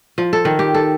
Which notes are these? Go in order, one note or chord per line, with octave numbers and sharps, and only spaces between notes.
F3
A4
D#3
G4
A4